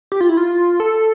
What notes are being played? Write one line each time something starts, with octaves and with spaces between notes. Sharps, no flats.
G4
F4
E4
F4
A4